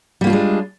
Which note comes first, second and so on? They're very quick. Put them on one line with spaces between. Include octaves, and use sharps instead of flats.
G3 A#3 F4 D4 G#3